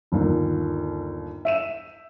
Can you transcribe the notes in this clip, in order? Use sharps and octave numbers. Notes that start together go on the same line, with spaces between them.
G1 D#2 A#2
E5 D#7 E7